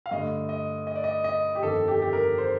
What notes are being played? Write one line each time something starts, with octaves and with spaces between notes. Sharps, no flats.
F5
G2 D3 A3 D#5
D#5
D#5
D5
D#5
D#5
G4
G1 F2 D#3 A4
G4
A4
G4
A#4
C5